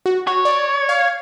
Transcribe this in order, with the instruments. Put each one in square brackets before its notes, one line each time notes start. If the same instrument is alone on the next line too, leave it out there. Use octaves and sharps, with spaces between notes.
[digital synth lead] F#4
[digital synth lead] F#4 [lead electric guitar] C#5
[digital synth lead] D5
F5